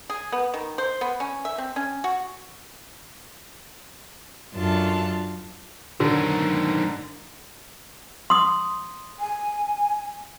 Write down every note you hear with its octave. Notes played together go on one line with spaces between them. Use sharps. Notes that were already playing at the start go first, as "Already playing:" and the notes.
G#4
B3
D#3
C5
B3
C#4
E5
C4
C#4
F#4
F#2 D4 F4 A4 A5
D3 D#3 F#3
C6 D#6
G#5